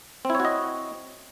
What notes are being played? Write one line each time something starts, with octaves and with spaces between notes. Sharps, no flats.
C4 E4 F#4 C#5 D#5